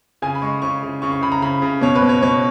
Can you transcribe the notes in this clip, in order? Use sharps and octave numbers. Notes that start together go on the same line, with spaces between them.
C#3 G#5
B5
G#3 C#6
C#3 C#6
C#3
C#3 C#6
C#6
C#3 B5
A#5
C#3 B5
C#3
B2 C#5
B4
B2
C#5
B2 C#5